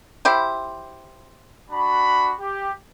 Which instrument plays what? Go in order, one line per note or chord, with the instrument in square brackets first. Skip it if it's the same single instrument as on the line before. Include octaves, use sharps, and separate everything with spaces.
[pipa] E4 G4 C5
[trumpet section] D4 F#4 B5
G4